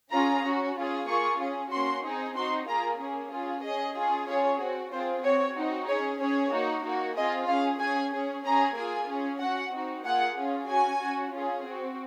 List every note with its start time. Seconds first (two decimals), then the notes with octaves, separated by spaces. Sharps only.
0.11 C#4 F4 G#4 A#5
0.43 C#4 F#4
0.75 C#4 F4 G#4
1.07 A#3 F4 G#4 C#6
1.40 C#4 G#4
1.71 A#3 C#4 F#4 C6
2.04 C4 D#4 G#4
2.35 C4 D#4 F#4 C6
2.67 A#3 F4 G#4 A#5
3.00 A#3 C#4 G#4
3.32 C#4 F4 G#4
3.63 C#4 G#4 D#5
3.96 C#4 F4 G#4
4.28 C#4 F4 G#4 C#5
4.60 C4 F#4
4.92 C4 F4 G#4 C5
5.24 C4 F#4 C#5
5.56 C4 D#4 F#4
5.89 C#4 G#4 C#5
6.20 C#4 G#4 C#5
6.52 A#3 D#4 F#4
6.85 A#3 D#4 F#4
7.16 C4 F4 G#4 D#5
7.49 C#4 G#4 F5
7.80 C#4 G#4 G#5
8.13 C#4 G#4
8.45 C#4 G#4 A#5
8.77 A#3 F4 G#4 G#5
9.09 C#4 G#4
9.41 C#4 F#4 F#5
9.73 C4 D#4 F#4
10.05 A#3 F4 G#4 F#5
10.37 C#4 F4 G#4
10.69 C#4 F#4 G#5
11.01 C#4 F#4
11.33 C#4 F4 G#4
11.66 C4 F#4